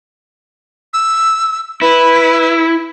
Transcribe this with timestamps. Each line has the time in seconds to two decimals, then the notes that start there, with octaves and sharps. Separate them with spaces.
0.94 E6
1.81 E4 B4